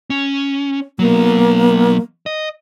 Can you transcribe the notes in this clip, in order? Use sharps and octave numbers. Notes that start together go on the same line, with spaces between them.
C#4
F#3 A#3 B3
D#5